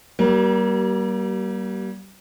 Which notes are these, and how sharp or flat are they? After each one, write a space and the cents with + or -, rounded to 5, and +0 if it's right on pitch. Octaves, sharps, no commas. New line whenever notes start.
G3 -30 A#3 +25 G4 -40